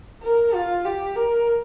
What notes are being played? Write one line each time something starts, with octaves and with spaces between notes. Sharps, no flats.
A#4
F4
G4
A#4